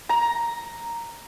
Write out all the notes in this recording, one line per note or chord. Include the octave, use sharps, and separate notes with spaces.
A#5